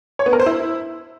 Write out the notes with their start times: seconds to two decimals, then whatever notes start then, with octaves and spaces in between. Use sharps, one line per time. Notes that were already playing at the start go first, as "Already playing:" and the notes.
0.19 C#5
0.26 B3
0.33 A#4
0.40 C5
0.46 E4